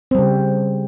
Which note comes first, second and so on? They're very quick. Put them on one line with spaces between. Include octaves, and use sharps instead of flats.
C4 G3 C#3